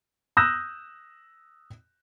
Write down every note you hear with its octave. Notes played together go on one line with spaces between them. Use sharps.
D#6 E6 F#6 G6 A#6 E7